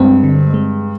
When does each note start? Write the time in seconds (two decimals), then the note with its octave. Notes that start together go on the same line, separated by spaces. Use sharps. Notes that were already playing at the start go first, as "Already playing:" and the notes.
Already playing: G2 G#3 C4
0.24 D3
0.54 G#3